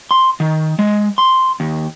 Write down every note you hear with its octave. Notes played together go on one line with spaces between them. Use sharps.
C6
D#3
G#3
C6
D#2